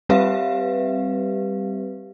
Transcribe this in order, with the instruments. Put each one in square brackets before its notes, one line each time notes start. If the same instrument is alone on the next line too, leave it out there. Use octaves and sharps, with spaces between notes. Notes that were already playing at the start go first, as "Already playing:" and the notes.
[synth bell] G3 C4 G4 B4 E5 F5